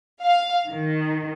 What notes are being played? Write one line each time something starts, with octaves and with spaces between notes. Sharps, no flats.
F5
D#3